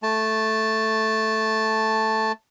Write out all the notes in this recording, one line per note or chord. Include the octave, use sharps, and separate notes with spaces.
A3 A5